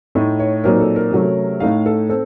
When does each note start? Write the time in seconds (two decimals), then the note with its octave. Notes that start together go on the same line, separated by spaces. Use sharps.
0.15 A2 A3 D#4
0.39 C#5
0.64 A#2 F#3 C4 D#4 A#4
0.80 A4
0.96 A#4
1.12 C3 F#3 A3 C#4
1.60 A2 A3 D#4 F5
1.86 A4
2.09 C4 A4